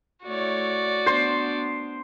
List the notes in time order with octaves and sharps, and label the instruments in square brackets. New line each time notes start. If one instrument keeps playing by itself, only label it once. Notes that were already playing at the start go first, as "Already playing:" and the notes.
[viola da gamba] A3 E4 C#5 [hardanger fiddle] F#4 D5
[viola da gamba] B3 D4 [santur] C5